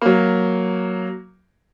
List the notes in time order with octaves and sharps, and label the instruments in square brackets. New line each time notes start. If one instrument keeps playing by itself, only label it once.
[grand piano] F#3 A#3